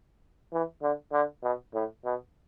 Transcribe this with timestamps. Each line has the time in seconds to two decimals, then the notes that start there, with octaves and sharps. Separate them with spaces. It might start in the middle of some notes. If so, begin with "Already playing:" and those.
0.53 E3
0.82 D3
1.12 D3
1.43 B2
1.74 A2
2.05 B2